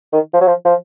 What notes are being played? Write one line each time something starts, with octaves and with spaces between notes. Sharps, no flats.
D#3
F3
F#3
F3
F3